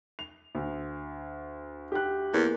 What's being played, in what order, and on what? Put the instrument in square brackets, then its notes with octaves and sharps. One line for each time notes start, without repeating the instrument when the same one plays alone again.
[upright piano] F7
[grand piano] D2
[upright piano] G4 F#6
[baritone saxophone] E2 [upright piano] A#3